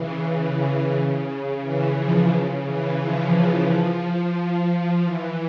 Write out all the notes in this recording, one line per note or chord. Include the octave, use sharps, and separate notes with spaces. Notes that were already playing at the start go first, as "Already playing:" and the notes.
Already playing: C#3 E3
C#3
E3
F3
C#3
E3
F3
F3
E3